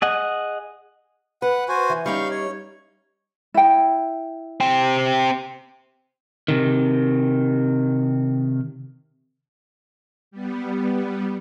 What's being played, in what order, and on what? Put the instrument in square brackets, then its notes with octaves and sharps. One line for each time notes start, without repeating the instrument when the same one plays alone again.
[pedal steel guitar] G#4 D#5 F#5
[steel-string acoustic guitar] B4 [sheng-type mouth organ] F#5
[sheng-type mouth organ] F#4 C5 G#5
[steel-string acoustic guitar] E3
[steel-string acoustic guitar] G3 C#4 D#4 [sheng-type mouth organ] F5 C#6
[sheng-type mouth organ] C#5
[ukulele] E4 G5
[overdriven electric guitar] C4 G4
[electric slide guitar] C3 D#3
[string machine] G3 B3